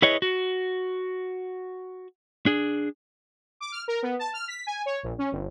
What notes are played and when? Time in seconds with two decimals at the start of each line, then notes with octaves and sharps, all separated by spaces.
0.02 E4 G#4 B4 C#5 D#5
0.22 F#4
2.46 D4 G#4
3.60 D6
3.72 F6
3.88 A#4
4.03 B3
4.19 A5
4.33 F6
4.48 B6
4.67 G#5
4.86 C#5
5.03 A#1
5.18 C#4
5.32 G1